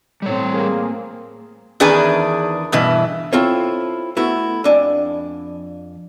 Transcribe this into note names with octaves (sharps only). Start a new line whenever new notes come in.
A2 G3 C4 C#5
A#3 G#4
E2 D#3 D4 G#4 B4 G#5
G2 B2 E3 E4
C4 E4 F4 A4 C#5
A3 B3 E4 F#4
F2 D4 G#5